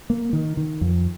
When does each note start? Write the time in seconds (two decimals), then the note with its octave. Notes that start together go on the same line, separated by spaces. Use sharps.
0.10 A#3
0.33 D#3
0.57 D#3
0.81 F2